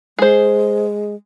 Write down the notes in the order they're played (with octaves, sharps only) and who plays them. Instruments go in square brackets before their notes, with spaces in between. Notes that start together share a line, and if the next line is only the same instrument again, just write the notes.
[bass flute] G#3 [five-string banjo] G#4 C5